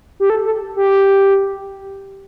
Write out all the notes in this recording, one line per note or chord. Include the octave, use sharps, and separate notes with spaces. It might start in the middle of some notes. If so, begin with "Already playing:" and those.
G4
A4
A4
G4